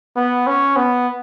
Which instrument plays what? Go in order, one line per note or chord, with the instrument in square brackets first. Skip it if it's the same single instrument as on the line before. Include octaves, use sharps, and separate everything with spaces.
[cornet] B3
C#4
B3